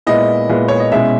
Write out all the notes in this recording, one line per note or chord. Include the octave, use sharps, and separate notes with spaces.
A#2 G#3 B3 E4 D#5
A#2 G#3 B3 E4
C#5
D#5
B2 G#3 C#4 E4 E5